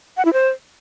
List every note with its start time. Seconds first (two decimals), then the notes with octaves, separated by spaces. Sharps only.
0.17 F#5
0.25 E4
0.33 C5